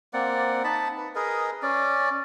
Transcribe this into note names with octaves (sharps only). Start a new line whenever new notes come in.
A#3 C4 D5 F#5
D#4 A5 B5
B4
G#4 A#4 B4 D#5
C#4 D5